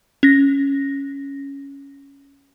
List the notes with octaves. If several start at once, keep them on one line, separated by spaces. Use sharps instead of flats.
C#4 A#6